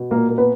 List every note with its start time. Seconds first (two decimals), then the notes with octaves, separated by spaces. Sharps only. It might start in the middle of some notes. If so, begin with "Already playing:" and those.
Already playing: B2
0.11 A#2 A#3 A#4
0.29 A#3
0.38 B3 B4